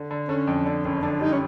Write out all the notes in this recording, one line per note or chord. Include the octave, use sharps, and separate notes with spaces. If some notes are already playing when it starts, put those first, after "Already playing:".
Already playing: D3
D3
D3 C#4
F2
D3 D4
F#1 C#4
D3 D4
G3 D#4
C#4